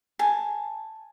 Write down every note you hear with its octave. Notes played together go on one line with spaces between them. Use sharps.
G#5 A5